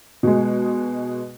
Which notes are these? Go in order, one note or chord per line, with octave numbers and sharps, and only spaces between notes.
B2 G#3